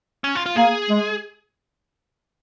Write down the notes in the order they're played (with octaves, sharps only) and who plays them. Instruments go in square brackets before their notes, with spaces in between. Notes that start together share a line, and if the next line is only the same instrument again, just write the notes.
[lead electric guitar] C#4
F4
F4
[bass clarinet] A#3 [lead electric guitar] G#4
[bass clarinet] G#3